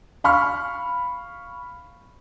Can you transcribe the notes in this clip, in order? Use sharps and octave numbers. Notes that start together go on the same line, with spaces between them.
F5 B5 C#6 F6